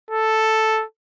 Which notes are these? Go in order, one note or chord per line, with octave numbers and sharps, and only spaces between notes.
A4